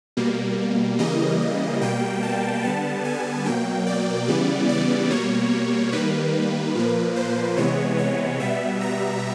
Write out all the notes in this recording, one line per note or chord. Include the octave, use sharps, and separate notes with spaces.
B2 G3 A#3
C#3 E3 G3 A#3 D#5
B2 G3 A#3 G5
A5
D3 G3 B3 A5
G#5
B2 F#3 A#3 G5
D5
C#3 E3 G3 B3
D5
B2 G3 A#3 C#5
D#3 G3 A#3 B4
A#2 F3 A#3
C5
C3 E3 G#3 B3 C#5
C#5
B2 G3 B3 E5
A#5